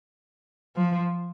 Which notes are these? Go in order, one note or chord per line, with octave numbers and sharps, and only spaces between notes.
F3